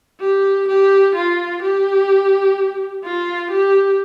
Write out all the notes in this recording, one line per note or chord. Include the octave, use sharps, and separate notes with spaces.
G4
G4
F4
G4
F4
G4